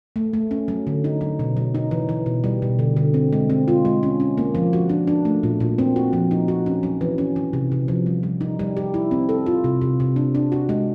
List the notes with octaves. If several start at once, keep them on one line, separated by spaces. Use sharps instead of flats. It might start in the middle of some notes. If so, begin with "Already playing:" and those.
A3
A3
C#4
F#3
D3
D#4
F#3
B2
F#3
D#4
E3
E3
B2
G3
B2
D3
D3
C4
G#3
C4
F4
G#3
C#4
C#4
A#3
F3
F#4
D4
D4
A3
A#2
A#2
C4
F#4
F3
D#4
F#4
C#4
F#3
E3
C#4
E3
C3
C3
F3
G3
G3
D#4
G3
G4
E4
C4
A4
F4
C3
C3
C3
D4
D4
F#4
G#3